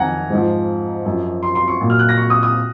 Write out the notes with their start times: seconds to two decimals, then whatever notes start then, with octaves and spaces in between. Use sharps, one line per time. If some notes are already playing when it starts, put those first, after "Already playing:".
Already playing: F2 D#3 F#3 F#5 G#5 A#5
0.30 G#2 F3
1.05 F#2 F3
1.43 C6
1.55 C6
1.68 C#6
1.81 A#2 F#3
1.90 F6
1.99 F#6
2.09 A#6
2.18 C#6
2.30 D#6
2.43 D#6